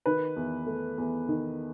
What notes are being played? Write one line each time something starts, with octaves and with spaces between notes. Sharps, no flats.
D#3 B4
E2
A3
E2
D#3